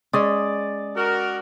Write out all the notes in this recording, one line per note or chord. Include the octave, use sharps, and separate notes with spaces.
G#3 C#4 D5 D#6
F#4 A#4